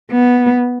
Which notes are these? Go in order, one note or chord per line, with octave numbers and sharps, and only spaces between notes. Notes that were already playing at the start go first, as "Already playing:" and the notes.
B3